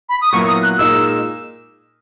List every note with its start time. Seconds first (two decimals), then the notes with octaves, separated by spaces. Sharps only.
0.09 B5
0.21 D#6
0.32 A#2 F#3 B3 E4 A#4 C#6
0.48 D#6
0.63 F#6
0.78 A#2 G#3 D#4 A#4 E6